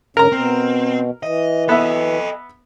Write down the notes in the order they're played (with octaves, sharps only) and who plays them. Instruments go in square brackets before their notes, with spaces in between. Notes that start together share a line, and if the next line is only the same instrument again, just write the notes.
[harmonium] G#2 D3 C#4 [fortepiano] A#4 A#5
[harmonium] B2 [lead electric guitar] C4
[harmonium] E3 [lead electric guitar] D#5
[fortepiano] B3 E5 [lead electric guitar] A4 D#5